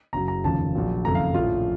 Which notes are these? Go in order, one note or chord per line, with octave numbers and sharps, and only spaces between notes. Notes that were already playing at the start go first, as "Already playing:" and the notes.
F#1 F#2 C#3 F#3 A#5
A#5
F1 D#2 C#3 F3 A5
A#1 A#2 F#3
F#1 F2 D#3 A3 A#5
F5
A#1 A2 F3 F4